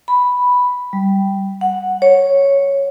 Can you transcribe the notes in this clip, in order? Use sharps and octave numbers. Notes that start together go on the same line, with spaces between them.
B5
G3
F#5
C#5